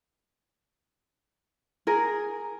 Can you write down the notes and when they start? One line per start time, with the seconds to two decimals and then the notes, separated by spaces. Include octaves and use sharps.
1.87 G#4 A#4